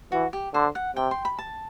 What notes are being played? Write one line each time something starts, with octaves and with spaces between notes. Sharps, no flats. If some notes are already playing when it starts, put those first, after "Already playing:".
E3 F#4
G4
D3 C5
F#5
C3 G5
C6
B5
A5